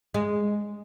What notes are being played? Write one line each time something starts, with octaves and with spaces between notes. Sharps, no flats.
G#3